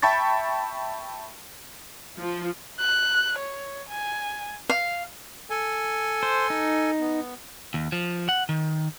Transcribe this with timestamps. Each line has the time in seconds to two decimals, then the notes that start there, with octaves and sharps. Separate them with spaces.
0.02 E5 G5 A5 B5 C#6 A6
2.19 F3
2.81 F#6
3.39 C#5
3.89 G#5
4.69 F5
5.50 A4 G#5
6.23 C5
6.50 D#4
7.00 B3
7.74 D#2
7.92 F3
8.29 F#5
8.49 D#3